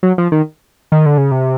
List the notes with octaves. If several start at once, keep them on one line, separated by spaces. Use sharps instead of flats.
F#3
F3
D#3
D#3
D3
C#3
C3